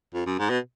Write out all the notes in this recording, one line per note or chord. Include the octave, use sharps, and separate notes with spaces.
F2
F#2
G#2
B2